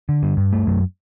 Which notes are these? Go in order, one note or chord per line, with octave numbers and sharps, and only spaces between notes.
D3
G2
G2
A3
F#2